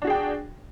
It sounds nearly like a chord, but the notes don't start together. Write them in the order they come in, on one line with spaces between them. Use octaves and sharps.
D4 F#4 G#4 G5